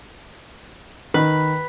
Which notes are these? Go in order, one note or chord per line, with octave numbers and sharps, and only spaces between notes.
D#3 B4